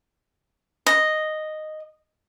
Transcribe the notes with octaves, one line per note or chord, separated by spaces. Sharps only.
D#5